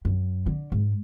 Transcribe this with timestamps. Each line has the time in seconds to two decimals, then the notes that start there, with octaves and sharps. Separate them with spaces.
0.05 F#2
0.46 D3
0.72 G#2